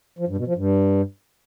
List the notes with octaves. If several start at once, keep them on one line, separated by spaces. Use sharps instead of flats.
F3
G2
B2
F3
G2